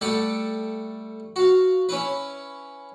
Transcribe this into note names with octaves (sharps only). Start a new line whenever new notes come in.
G3 A3 A4 F#5 G5
F#4 F5
C#4 E4 B4